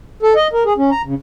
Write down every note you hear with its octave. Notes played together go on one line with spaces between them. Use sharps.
A4
D#5
A#4
G#4
C#4
A#5
C#3